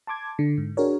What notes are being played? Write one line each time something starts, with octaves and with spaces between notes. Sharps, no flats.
A5 C6 D6 G#6
D3
G#2
D4 F#4 G#4 A#4 C#5